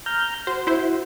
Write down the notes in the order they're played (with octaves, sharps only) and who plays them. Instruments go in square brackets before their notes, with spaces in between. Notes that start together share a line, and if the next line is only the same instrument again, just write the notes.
[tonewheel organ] A#5 F6 G6
[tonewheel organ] F#4 [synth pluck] C5
[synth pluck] E4 C5